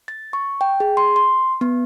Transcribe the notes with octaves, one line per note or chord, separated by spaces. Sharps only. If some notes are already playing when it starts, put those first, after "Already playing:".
A6
C#6
G5
G#4
C6
C6
B3